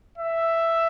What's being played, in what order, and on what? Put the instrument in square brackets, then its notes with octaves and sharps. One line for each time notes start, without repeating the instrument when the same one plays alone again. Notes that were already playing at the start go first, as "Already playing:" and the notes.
[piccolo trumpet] E5